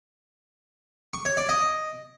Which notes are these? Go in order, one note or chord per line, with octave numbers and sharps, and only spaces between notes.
C#6
C#5
D5
D#5